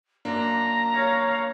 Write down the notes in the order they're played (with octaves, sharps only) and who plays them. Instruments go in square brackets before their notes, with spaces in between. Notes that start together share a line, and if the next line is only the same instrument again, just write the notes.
[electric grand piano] F#2 A#3 D4 [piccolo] A#5
[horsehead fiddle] C#5 F5